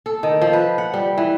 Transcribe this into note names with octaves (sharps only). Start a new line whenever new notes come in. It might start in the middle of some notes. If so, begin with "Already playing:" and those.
A4
D#3
F3
B4
F#5
G3
E3